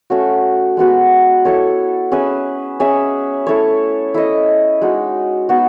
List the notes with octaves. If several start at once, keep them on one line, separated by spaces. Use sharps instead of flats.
A3 C#4 F#4
G#3 B3 F#4 B4
E4 A4 C#5
C#4 G#4 B4 E5
C#4 G#4 C#5 E5
A3 E4 A4 C#5
E4 A4 D#5
G#3 D#4 F#4
B3 D#4 F#4